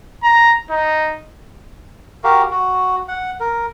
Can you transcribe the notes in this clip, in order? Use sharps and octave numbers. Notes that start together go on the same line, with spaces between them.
A#5
D#4
F#4 G4 A#4 F5
F#4
F#5
A#4